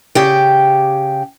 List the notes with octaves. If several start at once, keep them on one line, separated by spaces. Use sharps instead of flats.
C#3 G4 G5